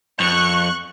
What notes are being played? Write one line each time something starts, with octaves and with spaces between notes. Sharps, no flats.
F2 C#6 F#6